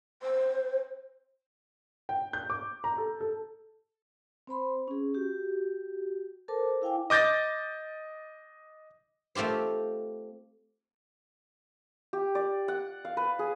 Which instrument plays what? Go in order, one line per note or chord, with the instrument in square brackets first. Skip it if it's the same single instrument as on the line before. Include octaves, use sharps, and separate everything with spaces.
[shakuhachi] C5
[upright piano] G5
G6
D6
A#5
A4
A4
[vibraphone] C4 C5 B5 C6
C#4 G#4
F#4 G4
A4 A#4 C5 A5 D6
E4 F5 G5 G#5 D6
[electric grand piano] D#5 D6 G6 A6 A#6
[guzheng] A3 C4 F4 G4 C5
[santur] G4
D5
F#5
F5
B4
G#4